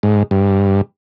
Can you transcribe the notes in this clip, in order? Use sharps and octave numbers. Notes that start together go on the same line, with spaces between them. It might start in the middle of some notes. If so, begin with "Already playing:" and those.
G#2
G2